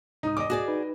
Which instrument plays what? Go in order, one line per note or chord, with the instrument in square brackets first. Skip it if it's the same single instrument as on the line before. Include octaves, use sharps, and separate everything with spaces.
[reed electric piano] C2 G#2 D#6 [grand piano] D#4
[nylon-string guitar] E2 [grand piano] D#5 D6
[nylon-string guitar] F#4 G#4 D5
[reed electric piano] D#4 B4